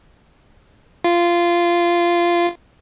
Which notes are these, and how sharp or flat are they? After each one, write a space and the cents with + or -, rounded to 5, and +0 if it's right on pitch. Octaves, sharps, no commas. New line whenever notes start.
F4 -15